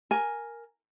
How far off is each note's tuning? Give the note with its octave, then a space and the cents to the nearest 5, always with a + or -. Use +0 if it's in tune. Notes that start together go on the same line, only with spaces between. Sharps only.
A#4 +0 G#5 +0